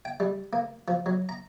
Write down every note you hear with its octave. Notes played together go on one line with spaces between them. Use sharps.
G5
G3
A#3
F3
F#3
A#5